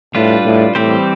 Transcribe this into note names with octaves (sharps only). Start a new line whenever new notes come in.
A2 G3 D4 F4 B4
A2
A2 E3 G3 C4 G4 C5